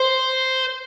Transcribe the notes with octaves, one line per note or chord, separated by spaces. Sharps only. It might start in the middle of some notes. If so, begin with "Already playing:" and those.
Already playing: C5